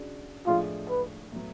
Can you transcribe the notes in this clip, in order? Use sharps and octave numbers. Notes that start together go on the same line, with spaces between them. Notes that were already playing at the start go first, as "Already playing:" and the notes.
Already playing: C#3 G#3 D4 F#4
A2 F3 G#3 D4 F4 G#4
B4
A2 F#3 B3